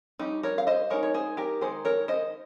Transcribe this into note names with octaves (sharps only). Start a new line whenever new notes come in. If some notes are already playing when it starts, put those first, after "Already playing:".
G3 C#4 D#4
A#4 C#5
F5
C5 D#5
G#3 D#4 A#4 C#5
C#5
G#4 C5
G4 A#4
D#3 G#3 D#4 G#4 C5
A#4 C#5
C5 D#5